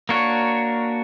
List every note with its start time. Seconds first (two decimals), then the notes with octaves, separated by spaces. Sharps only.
0.09 A#3 D4 F#4 A#4 C#5